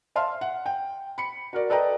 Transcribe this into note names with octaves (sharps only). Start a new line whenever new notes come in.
E5 F5 A5 C6 F6
F#5
G5
B5 C#7
F#4 A#4 D5
A4 B4 D5 D#5 G5 A#5